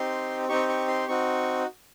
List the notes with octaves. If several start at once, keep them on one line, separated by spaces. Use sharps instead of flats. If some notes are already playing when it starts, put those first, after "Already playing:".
Already playing: C4 D#4 G4 C6
C4 D#4 G4 C#6
C#6
C6
C4 D#4 F#4 C#6